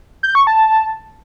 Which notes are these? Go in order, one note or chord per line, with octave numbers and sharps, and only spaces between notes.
G6
C#6
A5